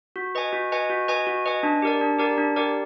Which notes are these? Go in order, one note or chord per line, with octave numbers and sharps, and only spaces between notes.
F#4
B4 D#5 G#5
F#4
B4 D#5 G#5
F#4
B4 D#5 G#5
F#4
B4 D#5 G#5
D4
G4 A#4 D5
D4
G4 A#4 D5
D4
G4 A#4 D5